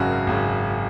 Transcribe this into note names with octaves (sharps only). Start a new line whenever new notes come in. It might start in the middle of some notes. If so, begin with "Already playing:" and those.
Already playing: G#1 F#2 C#3 F#4
G#1 F#2 C#3